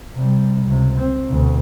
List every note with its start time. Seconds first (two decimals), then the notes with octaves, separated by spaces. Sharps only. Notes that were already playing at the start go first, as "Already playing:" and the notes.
0.14 C3 G3
0.67 C#2 C3
1.01 C4
1.30 D2 B2